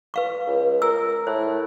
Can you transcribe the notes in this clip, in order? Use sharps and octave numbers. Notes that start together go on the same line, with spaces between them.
B4 F5 C#6
C#2
A#4 E6
A2 C5